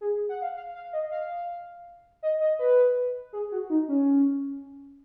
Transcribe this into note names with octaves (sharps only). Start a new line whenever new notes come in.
G#4
F#5
F5
F5
F5
D#5
F5
D#5
D#5
B4
G#4
F#4
D#4
C#4